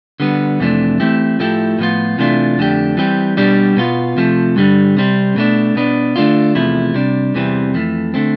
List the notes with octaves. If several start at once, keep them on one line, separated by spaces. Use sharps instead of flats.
D3 G3 B3
F2 C3 E3 A3 D4
E3 A3 C4 E4 G4
A2 F3 A3 E4 G4
A2 F3 B3 F4
C3 E3 A3 D4 F4
F2 D3 A3 D4 G4
E3 G3 C4 G4
B2 G3 D4 G4
B2 B3 F4
C3 F3 A3
G2 D3 G3
C3 G3 C4
B2 A3 D4
B2 B3 D4
D3 A3 D4 F4
E2 C3 F3 A3 E4
C3 G3 D4
E2 C3 E3 G3 C4
F2 E3 A3
D3 A3 C4